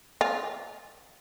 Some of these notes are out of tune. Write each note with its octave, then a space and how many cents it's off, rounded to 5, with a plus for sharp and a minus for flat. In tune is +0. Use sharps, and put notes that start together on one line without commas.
F4 +0 G#5 +0